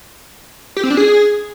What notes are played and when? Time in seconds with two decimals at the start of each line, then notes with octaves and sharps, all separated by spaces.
0.77 G4
0.83 C4
0.90 D4
0.97 G#4